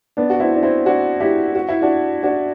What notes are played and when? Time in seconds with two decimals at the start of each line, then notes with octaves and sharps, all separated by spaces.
0.17 B3 D4
0.30 F#4
0.40 C4 E4
0.54 D4
0.63 C4 E4
0.86 D4 F#4
1.20 E4 G4
1.55 F#4
1.69 E4
1.82 D4 F#4
2.23 D4 F#4